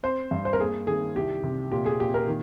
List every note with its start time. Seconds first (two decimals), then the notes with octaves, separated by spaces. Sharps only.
0.03 C4 C5
0.31 G2
0.45 C5
0.53 A#4
0.60 A#3 G#4
0.87 D#3 G#4
1.16 C2 G4
1.43 C3
1.72 A#2 G4
1.86 G#4
2.00 A#2 G4
2.14 A#4
2.27 D#3